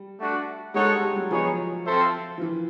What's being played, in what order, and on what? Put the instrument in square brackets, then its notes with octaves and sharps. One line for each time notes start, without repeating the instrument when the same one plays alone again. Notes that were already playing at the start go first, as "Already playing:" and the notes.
Already playing: [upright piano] G3
[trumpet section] A3 D4 F#4
[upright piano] G#3 [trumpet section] D#4 F#4 A4 C#5 F#5
[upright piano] G3
G3
F#3
[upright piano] F3 [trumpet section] B3 D#4 G#4 C#5
[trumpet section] C4 F4 A4 C5 E5
[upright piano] F3
E3